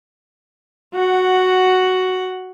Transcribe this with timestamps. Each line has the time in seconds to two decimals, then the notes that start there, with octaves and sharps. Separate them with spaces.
0.94 F#4 F#5